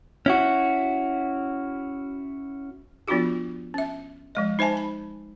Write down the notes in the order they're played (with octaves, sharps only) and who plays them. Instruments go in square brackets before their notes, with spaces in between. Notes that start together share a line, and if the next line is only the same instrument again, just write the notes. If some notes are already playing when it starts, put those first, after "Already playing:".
[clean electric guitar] C#4 E4 F#4
[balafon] F3 B3 D4 F4 F#4 G#4
C#4 E5
F3 G#3 D#5
D#4 C5 E5 G#5 A5
B5